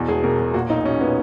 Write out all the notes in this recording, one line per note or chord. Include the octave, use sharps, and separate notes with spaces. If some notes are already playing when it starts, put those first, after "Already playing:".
Already playing: E2 B2
E1 G#4
B2 A#4
E1
A#2 F#4
B1 D#4
B1 C#4
A#2 B3